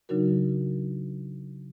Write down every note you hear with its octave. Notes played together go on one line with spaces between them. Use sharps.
C#3 F#3 D4 D#4 F#4 A#4